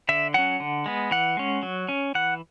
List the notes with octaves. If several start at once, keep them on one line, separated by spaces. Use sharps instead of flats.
D3 E5
F#3 C#4 F#5
D3
G#3 B3
E3 F#5
G#3 C#4
F#3
C#4
E3 F#5